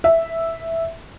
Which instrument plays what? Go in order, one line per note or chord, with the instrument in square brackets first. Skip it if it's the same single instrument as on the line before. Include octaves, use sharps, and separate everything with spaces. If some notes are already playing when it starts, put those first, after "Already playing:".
[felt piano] E5